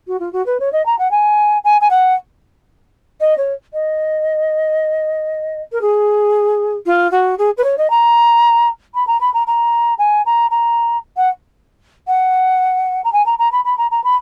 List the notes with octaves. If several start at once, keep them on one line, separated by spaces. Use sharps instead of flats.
F#4
F4
F#4
B4
C#5
D#5
A#5
F#5
G#5
G#5
G#5
F#5
D#5
C#5
D#5
A#4
G#4
F4
F#4
G#4
B4
C#5
D#5
A#5
B5
A#5
B5
A#5
A#5
G#5
A#5
A#5
F#5
F#5
A#5
G#5
A#5
A#5
B5
B5
A#5
A#5
B5